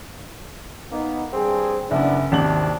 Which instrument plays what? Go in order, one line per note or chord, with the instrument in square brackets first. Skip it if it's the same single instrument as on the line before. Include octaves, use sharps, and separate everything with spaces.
[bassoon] A#3 [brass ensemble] B3 D#4
[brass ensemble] G2 G#4 [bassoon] C4
[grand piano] F#1 [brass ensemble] B3 D4 [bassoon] E4
[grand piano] G#1 D#2 F#7 [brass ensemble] C3 [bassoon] D4